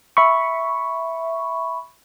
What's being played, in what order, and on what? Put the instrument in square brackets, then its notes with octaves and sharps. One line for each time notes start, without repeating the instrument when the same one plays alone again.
[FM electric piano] E5 B5 C#6